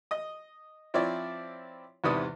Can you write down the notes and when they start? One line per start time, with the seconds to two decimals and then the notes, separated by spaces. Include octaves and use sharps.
0.11 D#5 D#6
0.94 F3 C4 E4 C#5 D5
2.04 E2 G#2 C3 B4 D5 D#6